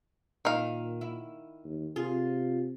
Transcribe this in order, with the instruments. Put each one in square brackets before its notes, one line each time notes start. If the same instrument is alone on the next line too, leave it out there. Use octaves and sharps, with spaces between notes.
[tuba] A#2 [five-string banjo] D#3 F5
[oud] E4
[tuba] D#2
[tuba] C3 [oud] F4 G#4